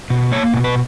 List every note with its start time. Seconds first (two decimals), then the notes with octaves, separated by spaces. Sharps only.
0.10 B2
0.31 A#3 C#5
0.54 B2
0.64 B4